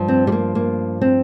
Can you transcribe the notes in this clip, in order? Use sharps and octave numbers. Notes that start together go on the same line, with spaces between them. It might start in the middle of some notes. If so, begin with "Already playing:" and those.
Already playing: G2 F3
C4
G3
A#3
A#3
C4